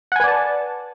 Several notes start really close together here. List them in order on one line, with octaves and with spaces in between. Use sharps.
F#5 G#5 B4 D5 A5